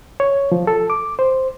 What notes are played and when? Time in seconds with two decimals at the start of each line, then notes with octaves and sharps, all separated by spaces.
0.20 C#5
0.52 F3
0.67 A4
0.90 D6
1.19 C5